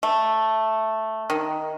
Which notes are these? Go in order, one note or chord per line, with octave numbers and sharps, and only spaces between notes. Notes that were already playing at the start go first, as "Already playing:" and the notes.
A3
D#3